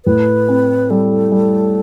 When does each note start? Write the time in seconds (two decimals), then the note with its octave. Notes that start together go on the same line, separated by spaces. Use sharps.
0.05 A2 B4
0.48 C4
0.90 G3 A4
1.32 G3